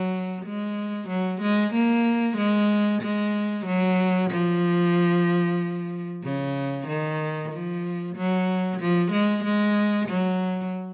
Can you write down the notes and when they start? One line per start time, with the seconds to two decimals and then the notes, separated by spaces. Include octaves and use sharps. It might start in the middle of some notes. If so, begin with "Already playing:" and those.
Already playing: F#3
0.45 G#3
1.09 F#3
1.41 G#3
1.74 A#3
2.38 G#3
3.02 G#3
3.66 F#3
4.31 F3
6.23 C#3
6.87 D#3
7.51 F3
8.16 F#3
8.80 F3
9.12 G#3
9.44 G#3
10.09 F#3